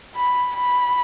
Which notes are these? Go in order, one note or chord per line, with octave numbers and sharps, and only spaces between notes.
B5
B5